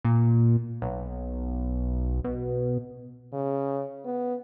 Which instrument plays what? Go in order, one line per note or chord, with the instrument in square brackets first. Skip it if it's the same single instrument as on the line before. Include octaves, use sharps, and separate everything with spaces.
[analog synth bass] A#2
B1
B2
[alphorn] C#3
B3